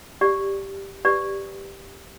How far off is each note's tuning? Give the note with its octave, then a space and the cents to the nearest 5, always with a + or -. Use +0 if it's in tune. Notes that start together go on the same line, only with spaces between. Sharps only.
G4 +0 D5 +0
G4 +0 B4 +10 D5 +0